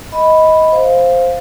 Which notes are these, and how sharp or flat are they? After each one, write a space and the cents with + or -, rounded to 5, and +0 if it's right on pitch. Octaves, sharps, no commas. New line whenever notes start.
D#5 +20 B5 +0
C5 +0 F5 +0